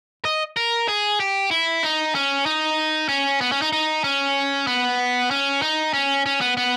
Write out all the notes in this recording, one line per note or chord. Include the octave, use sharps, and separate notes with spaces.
D#5
A#4
G#4
G4
E4
D#4
C#4
D#4
C#4
B3
C#4
D#4
D#4
C#4
B3
C#4
D#4
C#4
C#4
B3
B3